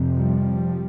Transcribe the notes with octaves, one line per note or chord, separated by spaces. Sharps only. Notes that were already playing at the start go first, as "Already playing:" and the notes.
Already playing: F2 C3
F3 G3